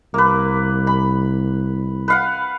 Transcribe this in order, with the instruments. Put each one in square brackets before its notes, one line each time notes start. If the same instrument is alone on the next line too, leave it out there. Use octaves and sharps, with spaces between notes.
[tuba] C2 [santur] A#3 B4
[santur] B5
B4 F5 F#5